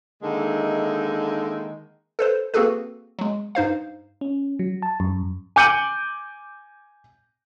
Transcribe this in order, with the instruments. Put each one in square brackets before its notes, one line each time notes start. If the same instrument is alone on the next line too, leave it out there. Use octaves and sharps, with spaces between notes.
[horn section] D3 D#3 G#3 A#3 D#4 E4
[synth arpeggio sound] A4 B4 C5
A#3 C4 F#4 G#4 A4 B4
F#3 G#3
G2 D#4 C5 F5
[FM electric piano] C#4
F#3
A5
F#2
[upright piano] G#5 D6 G6 C#7 D#7 F#7